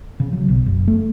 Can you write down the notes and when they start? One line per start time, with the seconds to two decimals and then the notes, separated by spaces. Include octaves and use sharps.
0.20 C#3
0.33 F#3
0.48 B1
0.66 F#1
0.88 A3